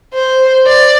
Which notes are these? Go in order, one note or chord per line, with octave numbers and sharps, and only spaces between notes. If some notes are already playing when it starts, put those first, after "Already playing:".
C5
D5